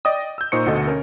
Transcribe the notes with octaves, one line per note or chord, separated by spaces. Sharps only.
D5 D#5 G5 D#6
E6 G6
A#2 D#4 C5 C#6 D#6 C#7
D2 B2 D3 A4 D#5
C#4 A#4